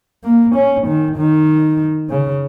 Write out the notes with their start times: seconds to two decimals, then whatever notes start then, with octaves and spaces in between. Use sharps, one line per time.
0.24 A#3
0.55 C#4
0.87 D#3
1.17 D#3
2.10 C#3